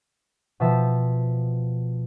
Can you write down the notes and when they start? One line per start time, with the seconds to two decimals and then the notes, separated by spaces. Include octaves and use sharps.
0.60 B2 F3 E5 A5